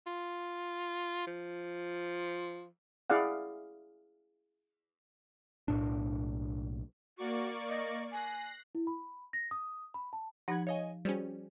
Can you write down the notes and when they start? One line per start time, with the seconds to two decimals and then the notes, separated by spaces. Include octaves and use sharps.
0.07 F4
1.27 F3
3.10 E4 G#4 D5 F5 F#5
5.68 B1 A2 D4
7.18 A#3 F#4 D5 C#6
7.69 D#5
8.12 G#5 F#6 A#6 C7
8.75 E4
8.87 B5
9.33 A#6
9.51 D#6
9.94 B5
10.13 A5
10.48 F3 D#4 G4 F#5 B5 G#6
10.67 C#5 D#5 F5 G#5
11.05 G3 C#4 F#4 G#4 C5